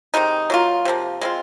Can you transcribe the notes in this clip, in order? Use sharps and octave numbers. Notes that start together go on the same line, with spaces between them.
C3 D#3 G#3 D#4
F#3 A#3 F4
C3 F3 A#3
G#3 C4 F4